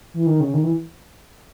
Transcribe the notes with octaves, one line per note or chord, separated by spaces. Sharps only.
E3
D#3
C#3
D#3
E3